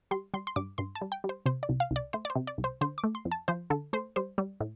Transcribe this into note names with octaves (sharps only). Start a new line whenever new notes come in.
G3 C6
G3 C6
C6
G2 D6
G2 C6
A5
G3
G5
G3
C5
C3 C5
D5
C2
F5
C2
D5
A3 C5
D5
C5
C3
D5
C2
C5
D3 C5
D6
A3
C6
F2
A5
F3 C5
D3 A4
A3 C5
G3 C5
G3
A2